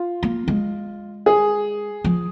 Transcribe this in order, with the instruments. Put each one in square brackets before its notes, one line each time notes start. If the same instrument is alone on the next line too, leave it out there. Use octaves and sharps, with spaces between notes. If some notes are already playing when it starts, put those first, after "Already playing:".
Already playing: [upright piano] F4
[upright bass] A#3
G#3
[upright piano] G#4
[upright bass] F3